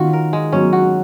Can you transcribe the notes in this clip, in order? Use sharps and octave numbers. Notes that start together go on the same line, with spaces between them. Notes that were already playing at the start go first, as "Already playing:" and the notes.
Already playing: D#3 C#4 F4 F#4
A#4
G#3
F#3 C#4
F#4